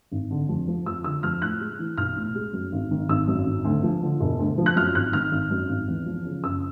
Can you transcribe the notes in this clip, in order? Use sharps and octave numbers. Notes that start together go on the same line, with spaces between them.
G#1
D3
F2
F3
F2 E6
D3 E6
F2 F6
A2 F#6
G#3
E3
B1 F6
A2
G#3
F#2
G#1
D#3
G#1 E6
F#2
G#1
D2
F3
D3
E1
D2
F3
F#6
F#2 F6
G#1 F#6
D#3 F6
G#1
F#2
G#1
E2
F3
C#3
F#1 E6